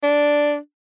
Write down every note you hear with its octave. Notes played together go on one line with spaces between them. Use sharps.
D4